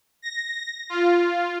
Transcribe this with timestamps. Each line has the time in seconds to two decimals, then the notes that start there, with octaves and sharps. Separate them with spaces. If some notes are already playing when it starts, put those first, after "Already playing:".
0.22 A#6
0.89 F4